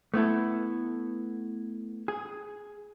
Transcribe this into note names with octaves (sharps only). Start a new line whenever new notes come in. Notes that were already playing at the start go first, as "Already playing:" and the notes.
A3 B3 E4 A4
G#4